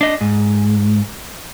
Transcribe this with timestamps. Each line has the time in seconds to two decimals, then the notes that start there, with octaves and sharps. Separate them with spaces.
0.01 D4 D#5
0.21 G#2